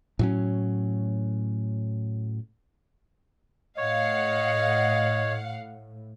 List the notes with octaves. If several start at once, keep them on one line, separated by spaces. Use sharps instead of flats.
A2 F#3 C#4
A2 C#5 D#5 F5 F#5